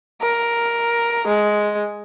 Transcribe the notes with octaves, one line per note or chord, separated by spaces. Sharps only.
A#4
G#3